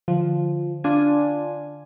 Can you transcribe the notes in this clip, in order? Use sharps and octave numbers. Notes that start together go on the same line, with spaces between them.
D3 F3
D4 F4 G#5